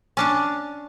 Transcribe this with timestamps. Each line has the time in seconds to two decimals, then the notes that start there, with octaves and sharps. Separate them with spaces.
0.17 C#4 D4 A5